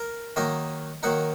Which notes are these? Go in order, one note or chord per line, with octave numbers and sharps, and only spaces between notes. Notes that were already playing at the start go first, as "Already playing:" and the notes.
Already playing: A#4
D#3 F#3 A#3 D#4 D#5
D#3 F#3 A#3 D#4 F#5